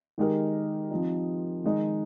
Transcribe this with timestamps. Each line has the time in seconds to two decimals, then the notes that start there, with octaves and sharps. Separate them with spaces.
0.18 D#3 G#3 D#4 G4 A#4
0.91 F3 C4 D#4
1.64 D#3 G#3 D#4